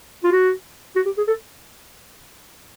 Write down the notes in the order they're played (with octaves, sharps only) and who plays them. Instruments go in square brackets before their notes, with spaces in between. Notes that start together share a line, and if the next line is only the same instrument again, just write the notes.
[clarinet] F4
F#4
F#4
G4
G#4
A4